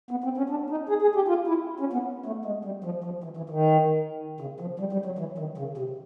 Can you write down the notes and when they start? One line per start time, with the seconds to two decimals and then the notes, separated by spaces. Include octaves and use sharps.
0.11 B3
0.24 C4
0.37 C#4
0.50 D4
0.70 D#4
0.89 G#4
1.02 G#4
1.15 G4
1.28 F4
1.47 E4
1.80 C#4
1.93 B3
2.26 A3
2.45 G#3
2.65 G3
2.84 F3
3.04 F3
3.24 E3
3.37 E3
3.50 D#3
4.40 C#3
4.60 F3
4.80 G3
4.93 G3
5.05 F#3
5.19 E3
5.38 D#3
5.58 C#3
5.77 C3